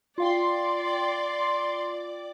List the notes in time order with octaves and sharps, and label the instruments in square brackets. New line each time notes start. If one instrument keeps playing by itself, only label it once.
[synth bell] F4 F5 G5 [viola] D5 [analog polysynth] C6